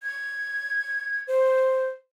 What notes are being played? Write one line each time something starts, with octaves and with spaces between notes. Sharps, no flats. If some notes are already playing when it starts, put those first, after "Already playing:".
G#6
C5